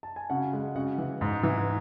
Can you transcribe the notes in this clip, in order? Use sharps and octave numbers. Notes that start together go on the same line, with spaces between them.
A5
G#5
C#3 F#4 F#5
G#3
C#3 F#4 F#5
E3
G#2
E3